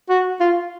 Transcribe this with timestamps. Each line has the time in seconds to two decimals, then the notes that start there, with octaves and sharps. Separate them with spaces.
0.10 F#4
0.40 F4